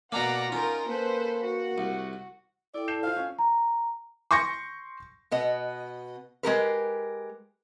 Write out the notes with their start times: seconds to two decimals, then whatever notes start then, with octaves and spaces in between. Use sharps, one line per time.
0.12 B2 A#3 D5 F#5 A#5
0.52 C#4 D#4 F4 A#4
0.88 A#3 A4 B4 C5
1.44 F#4
1.78 C2
2.74 E4 A4 D5 G5
2.88 E4 A4 A5 G6 C7 E7
3.03 F4 C5 F5
3.17 C#4 F4
3.39 A#5
4.31 C6 C#6 G6 A#6 C#7
5.31 B2 B3 D#5
6.43 G#3 G4 A#4 B4